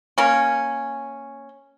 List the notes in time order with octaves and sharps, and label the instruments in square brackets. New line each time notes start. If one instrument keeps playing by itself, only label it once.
[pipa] A#3 C#4